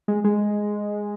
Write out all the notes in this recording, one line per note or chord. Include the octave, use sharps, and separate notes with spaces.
G#3
G#3